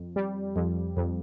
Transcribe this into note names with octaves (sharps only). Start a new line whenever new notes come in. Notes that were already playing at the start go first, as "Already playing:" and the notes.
Already playing: F2
G3
F2
F2